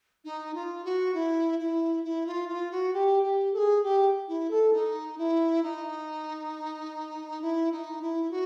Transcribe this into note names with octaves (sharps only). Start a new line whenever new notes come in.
D#4
F4
F#4
E4
E4
E4
F4
F4
F#4
G4
G4
A4
G#4
G4
E4
A4
D#4
E4
D#4
E4
D#4
E4
F#4